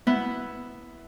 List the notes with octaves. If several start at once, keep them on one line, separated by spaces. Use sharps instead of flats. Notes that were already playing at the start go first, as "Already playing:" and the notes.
B3 E4